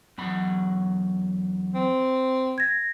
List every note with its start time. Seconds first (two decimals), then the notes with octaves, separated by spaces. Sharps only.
0.18 E2 F#3 B5
1.75 C4
2.58 G#6 A#6